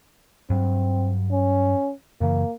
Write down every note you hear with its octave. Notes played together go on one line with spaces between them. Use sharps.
G2 F#3 C4
C#4
F#2 C#3 E3 A#3